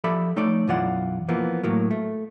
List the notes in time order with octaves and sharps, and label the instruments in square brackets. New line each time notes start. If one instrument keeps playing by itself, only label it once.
[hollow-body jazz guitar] F3 G4 A4 D5 E5 B5
F3 A3 D#4 C#5 D5
B1 F#2 E3 F4 D5 F#5
E3 F3 A#3 B3
A2 F#3 A#3
A3